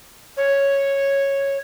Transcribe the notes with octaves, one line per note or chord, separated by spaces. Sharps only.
C#5